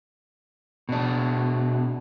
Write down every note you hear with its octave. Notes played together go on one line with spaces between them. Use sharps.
B2 D4